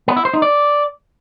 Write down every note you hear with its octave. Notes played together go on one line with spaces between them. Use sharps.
B3
E4
C5
D#4
D5